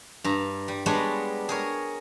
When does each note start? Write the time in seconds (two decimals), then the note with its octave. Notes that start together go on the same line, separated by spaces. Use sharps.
0.24 G2 A#5
0.68 G3
0.86 G3 G#3 B3 D4 C#5 D#5
1.49 G#4 A#4 C#5